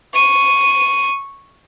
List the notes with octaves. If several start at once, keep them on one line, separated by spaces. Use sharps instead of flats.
C#6 D#7